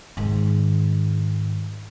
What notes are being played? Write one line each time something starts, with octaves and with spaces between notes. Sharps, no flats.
G#2 D#3